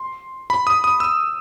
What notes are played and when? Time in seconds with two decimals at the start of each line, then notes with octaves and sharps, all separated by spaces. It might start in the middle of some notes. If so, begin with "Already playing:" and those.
Already playing: C6
0.50 B5
0.67 D#6
0.84 D#6
1.00 E6